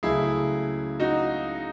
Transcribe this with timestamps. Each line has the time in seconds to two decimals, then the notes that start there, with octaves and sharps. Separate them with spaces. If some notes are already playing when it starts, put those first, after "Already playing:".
0.03 C#2 C#3 F#3 A3 E4 G#4
1.00 D#4 F#4